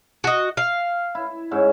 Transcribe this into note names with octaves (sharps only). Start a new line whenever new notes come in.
F#4 D#5
F5
E4
G#2 C#4 E5